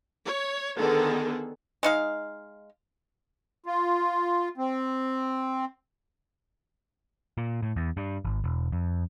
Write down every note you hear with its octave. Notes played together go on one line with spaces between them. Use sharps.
C#5
D3 D#3 B3 G#4 A4
G#3 D#4 F5
F4
C4
A#2
A2
E2
G2
G#1
E1
F2